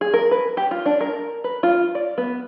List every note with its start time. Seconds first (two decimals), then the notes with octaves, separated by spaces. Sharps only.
0.01 G#4
0.14 A#4
0.31 B4
0.57 G4
0.71 F4
0.86 D4
1.01 A#4
1.44 B4
1.63 F4
1.95 D5
2.18 B3